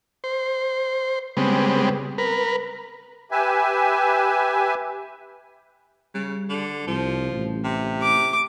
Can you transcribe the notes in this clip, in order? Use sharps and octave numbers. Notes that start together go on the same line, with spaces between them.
C5
C#3 G3 G#3 B3 C4
A#4 B4
G4 B4 E5 G#5
C#3 G3
D3
C2 F3
A1
C3
D6